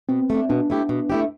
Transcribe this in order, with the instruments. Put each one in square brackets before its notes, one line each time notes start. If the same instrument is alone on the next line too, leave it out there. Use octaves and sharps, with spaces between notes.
[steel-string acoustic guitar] B2 [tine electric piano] C4
[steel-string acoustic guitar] A3 D4
[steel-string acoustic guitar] B2 [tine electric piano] D4
[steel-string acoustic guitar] A3 E4 G4
B2
A3 E4 G4